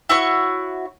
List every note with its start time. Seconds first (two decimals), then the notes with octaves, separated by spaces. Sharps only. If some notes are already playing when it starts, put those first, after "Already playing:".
0.09 E4 F#4 C#5 C#6